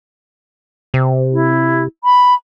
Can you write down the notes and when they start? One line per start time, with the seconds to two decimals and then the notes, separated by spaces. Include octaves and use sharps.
0.94 C3
1.32 E4
2.04 B5